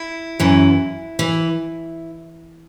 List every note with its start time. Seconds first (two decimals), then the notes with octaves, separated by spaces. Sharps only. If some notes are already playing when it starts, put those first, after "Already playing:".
Already playing: E4
0.40 F#2 E3
1.19 E3